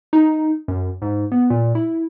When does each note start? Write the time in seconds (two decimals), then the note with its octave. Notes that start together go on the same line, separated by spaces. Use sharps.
0.13 D#4
0.68 F#2
1.02 G#2
1.32 B3
1.50 A#2
1.75 E4